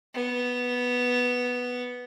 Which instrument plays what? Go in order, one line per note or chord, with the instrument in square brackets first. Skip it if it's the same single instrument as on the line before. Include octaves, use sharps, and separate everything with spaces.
[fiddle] B3